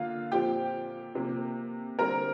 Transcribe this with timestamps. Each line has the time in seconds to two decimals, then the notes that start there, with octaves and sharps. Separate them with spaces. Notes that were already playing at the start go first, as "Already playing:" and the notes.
Already playing: D3 A#3 F4 F5
0.32 A#2 F3 C4 G4 G5
1.15 C3 F3 A#3
1.99 D3 G3 C4 A#4 A#5